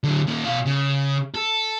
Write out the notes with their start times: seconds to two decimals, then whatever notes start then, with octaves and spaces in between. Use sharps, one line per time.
0.04 D3 F#3
0.27 A#2 D#3
0.45 B2 F5
0.66 C#3
1.35 A4